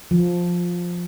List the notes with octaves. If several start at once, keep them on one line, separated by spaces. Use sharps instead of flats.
F3